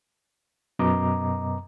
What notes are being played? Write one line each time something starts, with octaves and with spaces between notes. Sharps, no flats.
F#2 B2 B3 D#5 A#5 D6